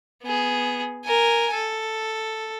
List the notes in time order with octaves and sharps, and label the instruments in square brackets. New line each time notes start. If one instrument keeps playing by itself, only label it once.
[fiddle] B3 G#4
A#4 G#5
A4